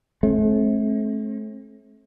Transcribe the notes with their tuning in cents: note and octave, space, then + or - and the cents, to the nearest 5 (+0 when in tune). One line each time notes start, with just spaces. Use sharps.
A3 -35 C4 +40